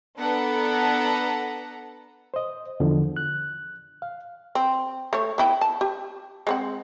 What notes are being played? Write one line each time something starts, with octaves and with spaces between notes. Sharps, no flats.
B3 D4 A4 B4 F#5 A#5
C5 D#5
E2 D3 F3
F#6
F5
C4
A3 C#5
B3 E4 G5
A5
G4
G#3 C4 F#5